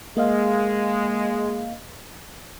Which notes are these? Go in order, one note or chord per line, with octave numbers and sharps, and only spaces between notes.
G#3 A#3 D#5 F5